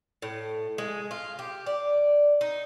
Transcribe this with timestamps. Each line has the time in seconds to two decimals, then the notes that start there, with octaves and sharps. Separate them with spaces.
0.22 A2
0.78 G#3
1.11 F4
1.39 G4
1.66 D5
2.41 D#4